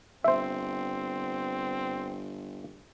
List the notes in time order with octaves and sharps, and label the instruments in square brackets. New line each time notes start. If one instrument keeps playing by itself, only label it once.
[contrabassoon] G1 [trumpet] C4 [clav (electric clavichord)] C5 E5